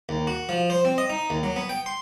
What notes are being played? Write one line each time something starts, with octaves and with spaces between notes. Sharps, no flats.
D#2
F#4
F3
C5
C4
D#5
D#4
D#2
F#3
B3
G5
C6